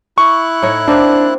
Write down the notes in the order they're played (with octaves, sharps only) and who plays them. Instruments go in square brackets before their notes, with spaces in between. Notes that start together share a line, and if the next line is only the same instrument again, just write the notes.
[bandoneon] E4 F#6 [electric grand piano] C#6
[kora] A2 D#4 C#5
[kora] A#3 C4 F5 [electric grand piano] D4